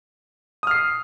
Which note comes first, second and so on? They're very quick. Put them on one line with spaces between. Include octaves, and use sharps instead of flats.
D#6 F6 C7